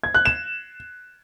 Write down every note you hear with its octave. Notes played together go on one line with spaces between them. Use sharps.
G#6
F#6
E7